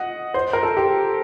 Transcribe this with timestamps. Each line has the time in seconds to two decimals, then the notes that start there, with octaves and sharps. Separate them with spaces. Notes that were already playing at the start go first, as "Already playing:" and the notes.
Already playing: D#5 F#5
0.34 C5
0.53 A#4
0.63 A4
0.77 G4